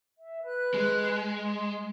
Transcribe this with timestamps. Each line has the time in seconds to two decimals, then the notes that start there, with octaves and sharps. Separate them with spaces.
0.18 E5
0.44 B4 F#6
0.74 G#3
1.36 C6